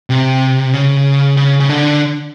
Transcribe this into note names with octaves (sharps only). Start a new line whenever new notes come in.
C3
C#3
C#3
C#3
D3